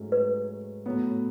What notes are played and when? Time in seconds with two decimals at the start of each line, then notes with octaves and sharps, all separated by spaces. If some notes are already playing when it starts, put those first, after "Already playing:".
Already playing: G#2 F#3 A3 C#4
0.12 B4
0.86 A2 F#3 B3